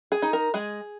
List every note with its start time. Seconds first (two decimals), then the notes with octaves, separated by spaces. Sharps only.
0.12 G#4
0.22 D#4
0.33 A#4
0.54 G#3 G#4